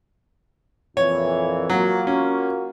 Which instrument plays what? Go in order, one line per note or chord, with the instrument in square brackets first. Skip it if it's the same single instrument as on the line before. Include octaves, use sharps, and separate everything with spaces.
[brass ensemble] F2 A#2 E3 [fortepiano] C#5
[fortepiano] F#3 [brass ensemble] A#3 F4 F#4
[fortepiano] C#4